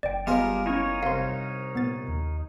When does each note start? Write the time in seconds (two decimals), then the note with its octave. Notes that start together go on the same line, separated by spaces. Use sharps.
0.03 F#1 D5 G5
0.27 G3 B3 F4 G#4 A#4 D#5
0.66 C#4 D#4 E4 A#4 C#5
1.03 C2 F5 C6
1.75 A#2 B3 A6
2.08 D#2